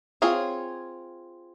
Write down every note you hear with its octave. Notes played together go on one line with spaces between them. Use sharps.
C4 F4 G#4 C#5